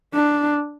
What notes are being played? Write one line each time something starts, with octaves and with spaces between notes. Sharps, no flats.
D4